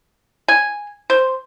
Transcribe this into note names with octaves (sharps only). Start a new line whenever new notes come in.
G#5
C5